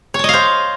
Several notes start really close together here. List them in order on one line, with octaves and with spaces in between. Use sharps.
C#5 A5 D#5 F5 C5